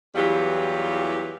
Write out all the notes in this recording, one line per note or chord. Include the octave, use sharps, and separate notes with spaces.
E2 E3 F#3 G3 F4 G4